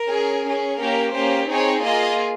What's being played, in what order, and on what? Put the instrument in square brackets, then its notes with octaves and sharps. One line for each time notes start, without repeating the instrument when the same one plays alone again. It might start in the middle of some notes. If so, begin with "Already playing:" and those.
Already playing: [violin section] A#4
C#4 G#4
C#4 G#4
A#3 C#4 G4 A#4
A#3 C#4 G4 C5
C4 D#4 G#4 C#5
A#3 F4 G#4 D#5